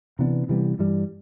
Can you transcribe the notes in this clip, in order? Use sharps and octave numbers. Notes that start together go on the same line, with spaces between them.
C3 E3 B3 D4
C3 E3 G3 B3
G2 E3 G3